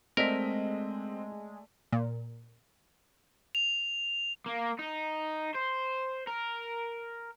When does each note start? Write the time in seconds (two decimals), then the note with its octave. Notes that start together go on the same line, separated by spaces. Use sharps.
0.17 G#3 A3 C4 A#4 D5 D#5 B6
1.92 A#2
3.55 F7
4.46 A#3
4.79 D#4
5.55 C5
6.27 A#4